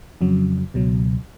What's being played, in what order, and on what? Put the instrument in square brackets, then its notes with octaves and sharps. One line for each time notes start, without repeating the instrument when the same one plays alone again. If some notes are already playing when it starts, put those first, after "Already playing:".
[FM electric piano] F2 C#3 F#3
C#2 B2 F#3